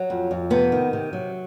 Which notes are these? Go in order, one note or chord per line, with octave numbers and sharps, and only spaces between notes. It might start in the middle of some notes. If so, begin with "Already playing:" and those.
Already playing: F#3
F2
F2
C3 B3
D#3
C3
F#3